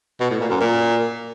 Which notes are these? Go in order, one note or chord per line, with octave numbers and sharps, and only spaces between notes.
B2
A2
A#2
F#2
A#2